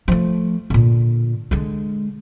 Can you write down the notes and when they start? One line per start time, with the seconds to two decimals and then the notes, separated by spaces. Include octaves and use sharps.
0.08 F3 A3
0.70 A#2 D3
1.51 D3 G#3